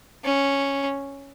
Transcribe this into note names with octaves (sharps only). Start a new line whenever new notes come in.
C#4